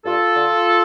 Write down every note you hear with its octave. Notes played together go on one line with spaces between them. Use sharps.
G2 F4 A4
D3